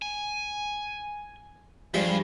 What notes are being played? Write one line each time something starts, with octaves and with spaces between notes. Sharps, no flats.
G#5
G2 F3 G3 G#3